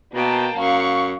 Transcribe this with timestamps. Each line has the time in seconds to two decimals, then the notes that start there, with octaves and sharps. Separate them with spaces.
0.15 B2 A#3 G5 A5
0.57 F#2 F5 C#6